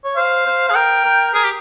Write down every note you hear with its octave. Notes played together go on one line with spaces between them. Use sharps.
C#5
C5 F5
C5
G#4 F5
A#4 G5
A#4
G#4 A#4
G4